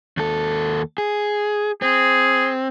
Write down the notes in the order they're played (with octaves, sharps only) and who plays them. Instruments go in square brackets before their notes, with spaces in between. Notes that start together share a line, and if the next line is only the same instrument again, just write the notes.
[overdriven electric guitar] D#2 A4
G#4
[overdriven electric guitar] C4 [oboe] G#4